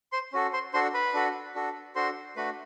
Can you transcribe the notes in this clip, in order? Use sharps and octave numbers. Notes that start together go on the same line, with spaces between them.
C5 C6
C#4 F#4 A4
C5 C6
D4 F#4 A4 C5 C6
B4 B5
D4 F#4 A4
D4 F#4 A4
D4 F#4 A4 C5 C6
A3 D4 F#4 B4 B5